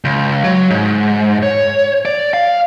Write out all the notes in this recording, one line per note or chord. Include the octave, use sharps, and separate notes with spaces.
C#2
F#3
G#2
C#5
D5
F5